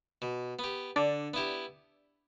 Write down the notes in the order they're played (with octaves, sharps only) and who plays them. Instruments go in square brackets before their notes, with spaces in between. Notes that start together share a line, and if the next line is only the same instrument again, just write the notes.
[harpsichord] B2
B3 G4
[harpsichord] D3 [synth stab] D4 D5
[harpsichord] B3 E4 G4